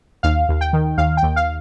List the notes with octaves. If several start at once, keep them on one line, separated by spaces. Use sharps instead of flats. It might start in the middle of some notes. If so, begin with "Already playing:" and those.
D#2 F5
D#2
G5
D#3
D#2 F5
G5
D#2
F5